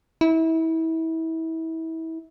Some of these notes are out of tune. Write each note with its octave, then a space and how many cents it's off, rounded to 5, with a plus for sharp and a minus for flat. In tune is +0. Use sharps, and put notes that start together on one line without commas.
E4 -30